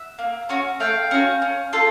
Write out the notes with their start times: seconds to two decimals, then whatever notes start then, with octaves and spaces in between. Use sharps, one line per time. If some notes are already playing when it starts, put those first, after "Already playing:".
Already playing: E5 F#5
0.19 A#3
0.49 C#4 F#4
0.80 A3 F5 G5
1.11 C#4 F#4
1.42 C#4
1.73 F4 A4